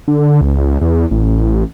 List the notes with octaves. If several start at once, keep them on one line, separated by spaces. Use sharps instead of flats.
D3
C#2
E2
A1